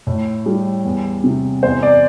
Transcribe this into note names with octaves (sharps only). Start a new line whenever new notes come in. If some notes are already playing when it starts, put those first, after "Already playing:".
A2
G3
E2
C3
E2 C5
D5